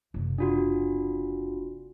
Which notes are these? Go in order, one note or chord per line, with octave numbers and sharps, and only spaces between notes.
F#1 C3
D4 F4 F#4